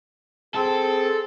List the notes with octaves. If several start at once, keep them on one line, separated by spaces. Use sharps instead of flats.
C4 G#4 A4